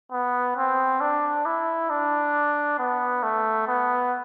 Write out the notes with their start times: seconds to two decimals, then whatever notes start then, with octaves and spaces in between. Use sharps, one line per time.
0.12 B3
0.56 C4
1.01 D4
1.45 E4
1.90 D4
2.79 B3
3.23 A3
3.67 B3